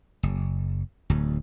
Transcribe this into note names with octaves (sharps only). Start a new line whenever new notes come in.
F#1
D1 D2